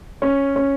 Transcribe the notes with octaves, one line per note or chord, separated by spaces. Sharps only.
C#4
C#4